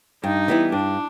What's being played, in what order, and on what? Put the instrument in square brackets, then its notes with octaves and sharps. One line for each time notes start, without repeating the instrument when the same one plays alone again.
[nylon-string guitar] G2 [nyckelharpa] D#4
[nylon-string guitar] E3 G3 B3 E4
[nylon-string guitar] G2 [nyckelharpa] D4